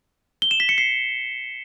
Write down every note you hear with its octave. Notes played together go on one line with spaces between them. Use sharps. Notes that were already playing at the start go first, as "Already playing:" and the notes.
G7
E7
B6
C#7
C7